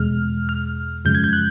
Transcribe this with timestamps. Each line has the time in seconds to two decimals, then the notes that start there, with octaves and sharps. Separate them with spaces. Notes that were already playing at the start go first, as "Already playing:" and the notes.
Already playing: E2 B2 G#3 F6
0.49 F6
1.05 F#2 C#3 F3 G#3 G6
1.15 G#6
1.24 G6
1.33 F#6